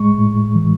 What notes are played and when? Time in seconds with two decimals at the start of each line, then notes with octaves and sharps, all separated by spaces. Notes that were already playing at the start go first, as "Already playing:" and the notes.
Already playing: A2 G#3 C#6
0.18 A2
0.55 E3